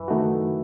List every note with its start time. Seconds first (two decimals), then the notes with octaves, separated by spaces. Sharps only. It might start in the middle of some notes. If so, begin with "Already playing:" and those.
Already playing: F#2 E3
0.08 D#3 A3 D#4 F#4